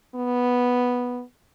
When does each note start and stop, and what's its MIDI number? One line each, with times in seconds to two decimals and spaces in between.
0.15 1.22 59